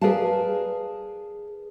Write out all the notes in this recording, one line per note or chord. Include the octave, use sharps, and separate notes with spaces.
G#4 A#4 B4 D5 F5 A5